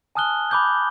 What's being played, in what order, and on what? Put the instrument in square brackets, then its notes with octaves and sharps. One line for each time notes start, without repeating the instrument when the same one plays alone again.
[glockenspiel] G#5 A5 D#6 F6 F#6 G7
B5 D6 G6 G#6